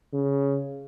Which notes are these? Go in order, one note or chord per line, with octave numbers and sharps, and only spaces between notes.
C#3